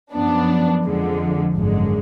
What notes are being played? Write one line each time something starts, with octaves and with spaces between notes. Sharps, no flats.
F#2 F3 B3 D4
F2 D3 F3 G#3
G#1 F#2 D3 G#3